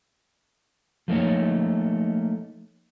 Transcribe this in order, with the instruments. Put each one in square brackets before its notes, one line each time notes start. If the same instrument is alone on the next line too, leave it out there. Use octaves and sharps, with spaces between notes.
[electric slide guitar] F3 A3 A#3 D#4 C#5